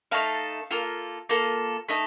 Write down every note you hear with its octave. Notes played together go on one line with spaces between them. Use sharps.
A3 D#4 A4 F5
A#3 F4 A4
A#3 F4 A4
A3 D#4 A4